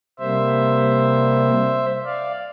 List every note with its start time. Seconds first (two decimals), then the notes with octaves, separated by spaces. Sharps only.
0.19 C3 G3 A#3 C5 E5
2.05 D5 F5